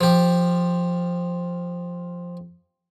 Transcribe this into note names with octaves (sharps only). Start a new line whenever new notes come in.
F3 G4